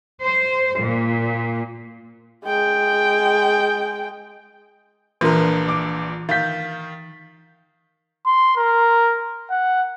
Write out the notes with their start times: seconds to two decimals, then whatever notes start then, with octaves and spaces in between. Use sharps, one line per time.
0.23 C5
0.79 A#2
2.46 G#3 G5
5.21 A#1 A#2 E3 D4 F4 A#4 B4 C6
5.68 D6
6.29 D#3 F5 G6 A6 B6
8.26 C6
8.57 A#4
9.50 F#5